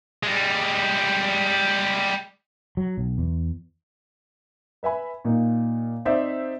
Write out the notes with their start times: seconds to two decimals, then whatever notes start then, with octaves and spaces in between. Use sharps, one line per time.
0.23 G3 G#3
2.77 F#3
2.98 B1
3.18 E2
4.83 B4 E5 G#5 B5
5.25 A#2 A#3 D#4
6.05 C4 D#4 C5 D5 E5